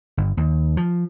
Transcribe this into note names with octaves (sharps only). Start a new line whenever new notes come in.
G1
D#2
F3